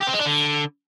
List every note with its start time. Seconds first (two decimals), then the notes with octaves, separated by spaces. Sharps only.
0.01 G4
0.07 C4
0.13 G#3
0.19 D4
0.26 D3